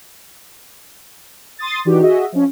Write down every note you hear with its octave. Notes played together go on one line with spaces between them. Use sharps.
C6 D#6 A6
E3 D4 D#4 F#4 G4
F#4 G#4 D#5 E5
F3 C#4